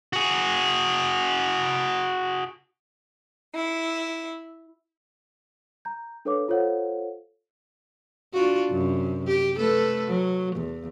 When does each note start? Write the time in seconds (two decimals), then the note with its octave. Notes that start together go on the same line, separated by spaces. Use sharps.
0.13 F#4 G#4
3.54 E4
5.85 A#5 G6
6.25 D4 A4 B4 C#5 F5 D6
6.48 F4 A4 C5 C#5 F5 F#5
8.34 D4 F4 F#4
8.71 F#2 C3
9.27 G4
9.58 A3 A4 B4
10.07 F#3
10.56 E2